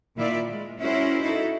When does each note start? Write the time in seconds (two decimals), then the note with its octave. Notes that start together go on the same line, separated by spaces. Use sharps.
0.16 A#2 D#3 E4 F4 D5 E5
0.46 G#3
0.78 C#4 E4 F#4 A#4 C5
1.22 D#4 E4 F#4 A4